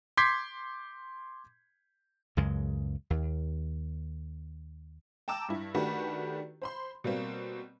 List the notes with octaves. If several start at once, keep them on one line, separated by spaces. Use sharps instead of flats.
C6 D6 G6 G#6 B6 C7
C#2 F#2 C#3 G#3
D#2
G5 A5 A#5 D6 E6
G2 E4
D#3 A3 D4 F#4 G4 B4
C5 B5 C6
B2 G3 A#3 C4